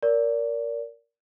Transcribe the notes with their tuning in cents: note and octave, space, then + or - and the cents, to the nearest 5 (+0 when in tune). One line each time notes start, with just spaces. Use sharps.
A#4 +0 D5 -25